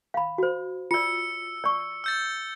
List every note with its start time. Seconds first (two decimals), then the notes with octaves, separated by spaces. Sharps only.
0.14 F5 B5
0.38 F#4 C5
0.91 F4 D5 E6 C#7
1.64 D5 C#6
2.04 E6 G6 A6